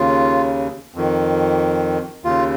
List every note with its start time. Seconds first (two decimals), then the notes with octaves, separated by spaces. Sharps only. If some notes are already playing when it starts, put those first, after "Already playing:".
Already playing: D#2 C#3 F4
0.95 F2 D#3
2.24 D#2 C#3 F4